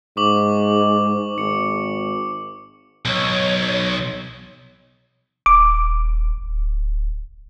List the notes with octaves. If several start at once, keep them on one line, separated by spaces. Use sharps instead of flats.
G#2 C#6 D6 F#7
G#1 C#7
B1 C#5
D#1 D6
D1